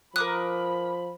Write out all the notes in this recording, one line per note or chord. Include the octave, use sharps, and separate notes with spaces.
F3 A#4 B5 D6 D#6 F#6